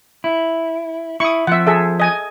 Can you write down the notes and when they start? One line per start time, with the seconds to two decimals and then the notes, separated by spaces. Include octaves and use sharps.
0.24 E4
1.20 E4 C#6 D#6
1.47 F3 C4 E5 F#5
1.66 G#4 A4 E5
2.00 D#5 G#5